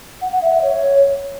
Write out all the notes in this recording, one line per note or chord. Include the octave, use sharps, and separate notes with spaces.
F#5
F#5
E5
E5
C#5